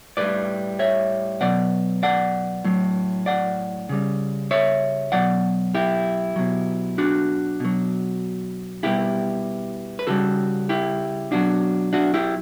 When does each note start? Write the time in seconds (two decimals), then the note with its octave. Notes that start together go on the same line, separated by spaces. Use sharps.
0.17 A2 G3 B4 D5
0.79 C#5 E5
1.41 B2 F#3 D5 F#5
2.03 D5 F#5
2.64 A2 F#3
3.26 D5 F#5
3.89 C#3 G3
4.51 C#5 E5
5.12 B2 F#3 D5 F#5
5.74 E4 G4
6.36 B2 F#3
6.98 D4 F#4
7.60 B2 F#3
8.83 B2 G3 E4 G4
9.99 B4
10.07 C#3 G3 F#4 A4
10.69 E4 G4
11.31 B2 F#3 D4 F#4
11.93 D4 F#4
12.14 E4 G4